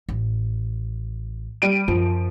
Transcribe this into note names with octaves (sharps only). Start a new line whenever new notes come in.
A1
G3 D7 D#7
F#2 F3